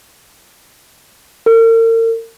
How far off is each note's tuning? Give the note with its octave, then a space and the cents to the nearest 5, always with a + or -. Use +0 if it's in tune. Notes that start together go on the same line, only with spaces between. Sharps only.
A#4 -40